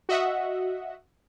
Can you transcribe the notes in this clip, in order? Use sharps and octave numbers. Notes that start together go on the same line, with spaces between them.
F#4 D#5 E5 F#5